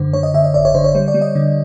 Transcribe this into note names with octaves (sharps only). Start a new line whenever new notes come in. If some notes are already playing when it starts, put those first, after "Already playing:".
Already playing: F#2 D3 C5
D3 C#5
D#5
D3 E5
D#5
G#1 D5
C#5
D3 C5
C#5
G3 C#5
D5
G3
D#5
D3